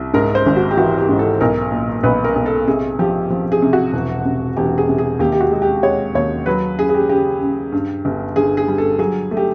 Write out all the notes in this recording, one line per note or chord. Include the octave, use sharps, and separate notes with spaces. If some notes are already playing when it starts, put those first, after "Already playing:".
Already playing: C2
G#2 A#4
C5
G#1
F#4
G4
E3 F#4
G4
G#2
A4
B1 A#4
A#2
B1 B4
A#4
B1
A4
C3 G#4
F3 G4
F3
G#4
C3
F#4
E1
C3
E1 G4
G#4
C3
G#4
D#2 G4
G4
F#4
G#3
G4
G#3 C#5
D#2 C#5
F#3 B4
F#2 G#4
G#4
G4
C#3 G4
C#3
G2
G1
D3 G#4
G#4
G3
A4
F#3 G#4
A3
G4